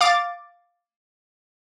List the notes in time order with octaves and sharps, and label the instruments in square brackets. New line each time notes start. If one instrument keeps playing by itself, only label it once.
[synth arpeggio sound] F5 D6 A6